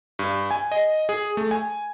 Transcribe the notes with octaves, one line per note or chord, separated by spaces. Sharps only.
G2
G#5
D#5
G#4
A3
G#5